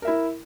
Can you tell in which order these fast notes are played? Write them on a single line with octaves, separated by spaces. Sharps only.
A#4 E5 E4